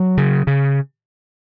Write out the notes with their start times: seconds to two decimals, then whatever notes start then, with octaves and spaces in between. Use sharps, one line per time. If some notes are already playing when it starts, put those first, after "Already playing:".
Already playing: F#3
0.17 C#3
0.47 C#3